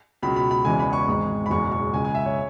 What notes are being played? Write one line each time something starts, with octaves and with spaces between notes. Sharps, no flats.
C#2 B2 F#3 B5
B5
B5
E1 E2 C#3 E3 G#3 G#5
B5
C#6
G#1 G#2 G#3
B5
F#1 E2 B2 G#3 C#6
C#6
C#2 C#3 G#3 G#5
G#5
E5
C#5